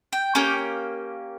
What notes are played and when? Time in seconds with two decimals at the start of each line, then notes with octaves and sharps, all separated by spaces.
0.12 G5
0.35 A#3 C#4 G4